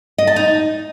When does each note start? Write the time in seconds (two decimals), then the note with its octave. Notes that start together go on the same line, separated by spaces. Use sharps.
0.18 D#5
0.27 A5
0.36 D#4